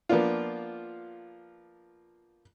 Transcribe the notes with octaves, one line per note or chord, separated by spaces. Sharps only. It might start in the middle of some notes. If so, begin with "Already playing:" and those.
F3 A#3 B3 D4 F4